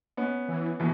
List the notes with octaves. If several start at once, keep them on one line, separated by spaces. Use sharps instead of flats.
B3 C#4
E3
C2 B2 E3